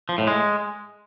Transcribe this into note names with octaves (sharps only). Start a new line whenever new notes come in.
F3
A2
G#3